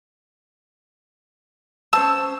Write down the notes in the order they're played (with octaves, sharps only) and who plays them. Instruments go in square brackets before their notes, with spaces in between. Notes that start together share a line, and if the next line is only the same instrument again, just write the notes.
[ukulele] C#4 C5 A5 [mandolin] E6